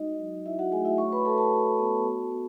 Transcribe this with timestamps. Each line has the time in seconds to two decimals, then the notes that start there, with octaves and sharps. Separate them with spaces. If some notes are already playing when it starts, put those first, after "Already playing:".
Already playing: G#3 D#4 F#4 D#5
0.19 F#3
0.46 E4 F#4 E5
0.59 F#4 F#5
0.72 A3 G#4 G#5
0.85 E4 E5
0.98 F#4 C#5 C#6
1.12 B4 B5
1.25 F#4 A4 A5
1.38 A4 A5
1.52 F#4
1.79 B3
2.05 F#4
2.32 B3